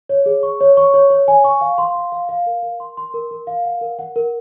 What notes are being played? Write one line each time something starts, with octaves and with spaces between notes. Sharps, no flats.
C#5
G#4
C#6
C#5
C#6
C#5
C#5
G#5
C#6
F5
C6
F5
F5
F5
A#4
A#4
C6
C6
A#4
A#4
F5
F#5
A#4
F#5
A#4